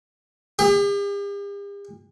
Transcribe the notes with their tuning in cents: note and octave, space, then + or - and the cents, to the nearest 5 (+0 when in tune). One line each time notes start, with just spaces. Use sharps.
G4 +45